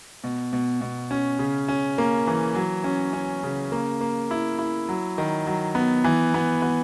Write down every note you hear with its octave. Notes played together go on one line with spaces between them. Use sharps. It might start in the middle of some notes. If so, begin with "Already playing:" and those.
B2
B2
B2
C#4
C#3
C#4
A#3
E3
F#3
C#4
C#4
C#3
A#3
A#3
E4
E4
F#3
D#3
F#3
B3
E3
B3
B3